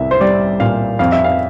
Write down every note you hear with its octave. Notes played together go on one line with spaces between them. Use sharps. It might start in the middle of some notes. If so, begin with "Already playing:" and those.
Already playing: C2 E5
C5
G3 D5
A#2 F5
F2 F5
E5
F5